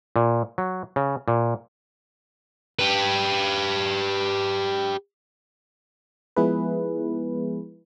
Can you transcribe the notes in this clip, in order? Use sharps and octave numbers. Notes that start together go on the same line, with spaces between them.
A#2
F#3
C#3
A#2
G4 B4
F3 G#3 B3 E4 G#4 B4